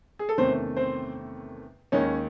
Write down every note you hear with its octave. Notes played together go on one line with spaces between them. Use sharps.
G#4
A4
E2 C3 D#3 A3 C4 C#4 C5
C4 C5
D#2 D#3 G#3 C#4 D#4 C#5